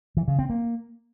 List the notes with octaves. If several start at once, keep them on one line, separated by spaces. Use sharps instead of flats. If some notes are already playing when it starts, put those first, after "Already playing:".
E3
C#3
C4
A#3